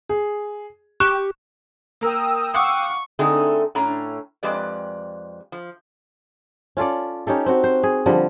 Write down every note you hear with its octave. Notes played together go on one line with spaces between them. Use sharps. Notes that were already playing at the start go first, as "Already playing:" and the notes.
G#4
G4 C#6 F#6 E7
A#3 A#4 G5 D#6 E6
F5 F#5 C#6 D6
D3 A3 C4 D#4 G#4
A2 C#4 D4 A#5
F2 G#3 G4 B4 D5
F3
C#4 F4 A4 D5
C#4 D#4 G4 A4
C4 F#4
C5
G#4
D3 F3 G3